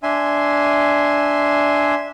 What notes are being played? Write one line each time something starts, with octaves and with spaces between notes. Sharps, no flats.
D4 E5 G#5 C6